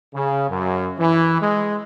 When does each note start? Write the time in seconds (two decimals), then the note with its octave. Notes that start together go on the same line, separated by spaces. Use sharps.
0.15 C#3
0.50 F#2
0.99 E3
1.41 G#3